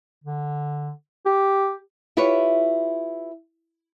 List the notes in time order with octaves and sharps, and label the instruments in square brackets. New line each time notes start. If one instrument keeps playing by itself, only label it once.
[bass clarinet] D3
G4
[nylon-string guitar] E4 F4 G4 B4 C#5 E5